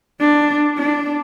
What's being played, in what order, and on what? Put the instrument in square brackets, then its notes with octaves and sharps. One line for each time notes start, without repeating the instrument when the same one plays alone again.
[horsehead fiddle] D4
D4